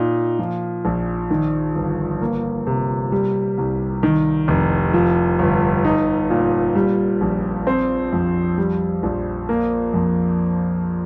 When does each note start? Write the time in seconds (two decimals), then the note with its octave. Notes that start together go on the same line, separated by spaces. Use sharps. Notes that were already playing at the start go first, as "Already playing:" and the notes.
Already playing: A#2 D#4
0.39 F3
0.85 A#1
1.30 D#3
1.75 G1
2.21 A#3
2.67 C3
3.12 G3
3.58 C2
4.03 D#3
4.48 F1
4.94 F3
5.39 G1
5.85 D#4
6.30 A#2
6.75 G3
7.21 A#1
7.67 C4
8.13 F2
8.58 G3
9.03 A#1
9.49 A#3
9.94 F2